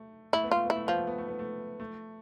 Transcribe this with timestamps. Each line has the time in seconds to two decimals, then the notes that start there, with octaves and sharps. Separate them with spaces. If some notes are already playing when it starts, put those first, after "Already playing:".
Already playing: A3
0.33 A3 E4
0.44 B3
0.51 A3 F4
0.65 B3
0.70 E4
0.76 A3
0.86 F3 B3
0.97 A3
1.07 B3
1.18 A3
1.28 B3
1.39 A3
1.80 A3